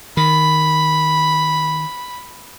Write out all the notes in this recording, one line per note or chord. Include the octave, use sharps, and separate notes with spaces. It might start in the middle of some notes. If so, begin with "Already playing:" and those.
D#3 B5